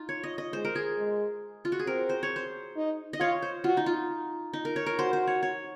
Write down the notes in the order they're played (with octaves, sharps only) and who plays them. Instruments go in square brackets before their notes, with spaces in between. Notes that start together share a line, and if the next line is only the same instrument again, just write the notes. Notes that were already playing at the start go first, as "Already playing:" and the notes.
Already playing: [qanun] D#4 F4
C#5
D#5
D#5
[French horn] G#3 [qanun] C5
[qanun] A#4
G#4
[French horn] G#3
[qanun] F4
F#4
G#4
[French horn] C4 [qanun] A#4
[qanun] C5
C#5
C5
[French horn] D#4
[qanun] D#5
[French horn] F4 [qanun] C#5
[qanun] C5
[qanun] F4 [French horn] F#4
[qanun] D#4
F4
D#4
A#4
C#5
A#4
[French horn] F#4 [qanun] C5
[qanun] C5
C#5
C#5